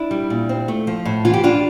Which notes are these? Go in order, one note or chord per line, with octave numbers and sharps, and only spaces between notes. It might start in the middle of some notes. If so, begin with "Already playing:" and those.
Already playing: D4 E4
G3
A#2
C4
A3
F3
A2
E3 F4
G4
D4 F4